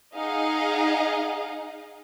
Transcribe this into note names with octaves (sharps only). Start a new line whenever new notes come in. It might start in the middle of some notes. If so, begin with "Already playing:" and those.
D#4 G#4 D#5 F5 F#5